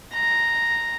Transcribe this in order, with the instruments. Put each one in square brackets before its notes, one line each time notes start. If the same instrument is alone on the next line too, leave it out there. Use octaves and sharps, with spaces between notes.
[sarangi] A#5